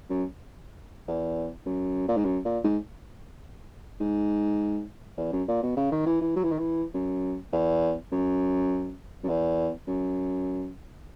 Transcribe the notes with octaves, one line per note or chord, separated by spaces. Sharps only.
F#2
E2
F#2
A#2
G#2
F#2
A#2
G#2
G#2
E2
F#2
A#2
B2
C#3
D#3
E3
E3
F#3
E3
D#3
E3
F#2
E2
F#2
F#2
E2
F#2